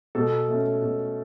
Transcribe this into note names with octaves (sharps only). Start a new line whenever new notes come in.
B2 A4
A3 C#4
B2